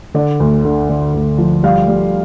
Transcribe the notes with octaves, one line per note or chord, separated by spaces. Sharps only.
D3 D5
D2
D3
D3
D2
F3
G3 F5
G3